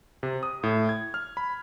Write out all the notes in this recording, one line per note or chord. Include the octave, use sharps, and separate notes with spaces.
C3
D#6
A2
G#6
F6
B5